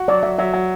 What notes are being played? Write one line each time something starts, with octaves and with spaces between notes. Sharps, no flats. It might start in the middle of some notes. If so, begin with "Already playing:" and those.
Already playing: F#4
F#3 D5
F#3 E5
F#3 E5
F#3